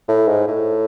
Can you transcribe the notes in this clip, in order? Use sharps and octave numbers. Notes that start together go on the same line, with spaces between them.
A2
G#2
A2